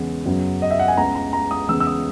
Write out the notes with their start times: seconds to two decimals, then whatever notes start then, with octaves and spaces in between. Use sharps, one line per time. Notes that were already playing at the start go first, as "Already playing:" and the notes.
Already playing: E2 C#3 G#3 B3
0.26 F#2 C#3 F#3 B3
0.62 D#5
0.71 E5
0.79 F#5
0.88 G#5
0.97 C#2 C#3 G#3 B3 A#5
1.15 A#5
1.33 A#5
1.51 D#6
1.69 E2 C#3 G#3 B3 E6
1.80 E6
1.87 D#6